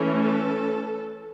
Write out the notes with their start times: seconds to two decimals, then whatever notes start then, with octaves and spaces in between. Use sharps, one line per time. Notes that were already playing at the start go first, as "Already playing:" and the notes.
Already playing: E3 A3 C#4
0.22 A4